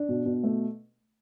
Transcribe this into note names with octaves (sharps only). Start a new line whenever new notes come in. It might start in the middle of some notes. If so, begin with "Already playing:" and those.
Already playing: D4
B2
B2
A3